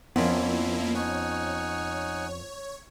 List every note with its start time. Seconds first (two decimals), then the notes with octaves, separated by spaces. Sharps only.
0.16 F2 F3 A#3 B3 C#4 E4
0.95 D#4 C#5 F#5 G#5